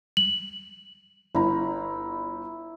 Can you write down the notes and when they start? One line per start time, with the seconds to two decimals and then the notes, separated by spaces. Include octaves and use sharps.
0.17 F#7
1.35 G1 E4 A#5